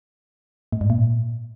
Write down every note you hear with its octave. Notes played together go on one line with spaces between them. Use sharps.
A2
G#2
A#2